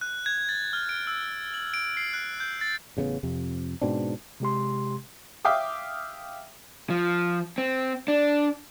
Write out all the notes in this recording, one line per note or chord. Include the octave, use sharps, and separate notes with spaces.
F#6
G#6
A6
F6
D7
E6
F#7
D7
C7
F#6
G6
A6
A1 C#3 G3 B3
F2 C3
G#2 B2 C4 D4
C3 G#3 G4 C6
E5 F5 G5 D6 D#6
F3
C4
D4